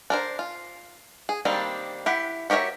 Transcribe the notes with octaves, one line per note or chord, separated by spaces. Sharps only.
D4 A#4 C5
F4
G#4
D#3 G3 A#3 C4 D4
E4 G4 F#5
F#4 G4 A#4 C#5 E5